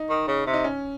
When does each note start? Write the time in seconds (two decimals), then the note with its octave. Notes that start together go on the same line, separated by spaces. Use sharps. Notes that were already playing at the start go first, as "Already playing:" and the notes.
Already playing: D#4
0.09 D#3
0.28 C#3
0.46 C3
0.54 D#4
0.64 C#4